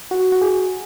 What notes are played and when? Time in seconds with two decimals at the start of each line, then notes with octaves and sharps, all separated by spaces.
0.11 F#4
0.32 F#4
0.41 G#4